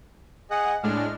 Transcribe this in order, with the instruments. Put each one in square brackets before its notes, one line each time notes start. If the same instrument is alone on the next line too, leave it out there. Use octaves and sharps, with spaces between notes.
[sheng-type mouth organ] G#4 D#5 [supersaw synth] F#5
[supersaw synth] A2 G#3 D4 [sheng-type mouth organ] F6